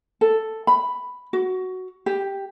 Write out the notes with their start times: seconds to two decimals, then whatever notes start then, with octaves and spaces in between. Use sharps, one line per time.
0.21 A4
0.67 B5
1.33 F#4
2.06 G4